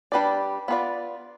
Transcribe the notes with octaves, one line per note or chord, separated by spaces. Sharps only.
G3 D4 G4 B4 D5
B3 F4 B4 D5